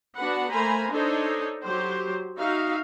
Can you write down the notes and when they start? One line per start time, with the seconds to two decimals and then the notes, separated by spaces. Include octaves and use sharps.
0.17 B3 D4 F#4 B4 F#5
0.51 A3 A#3 C5 G#5 A#5 B5
0.92 D4 D#4 A4 C5 C#5 D#5
1.63 F#3 G4 C5
2.37 D#4 F#4 E5 F5